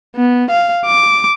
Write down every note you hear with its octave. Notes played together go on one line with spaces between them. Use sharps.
B3
F5
D6